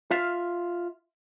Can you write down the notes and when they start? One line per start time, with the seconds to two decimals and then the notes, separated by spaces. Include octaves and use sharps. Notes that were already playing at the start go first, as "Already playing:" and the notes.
0.11 F4 E5 F5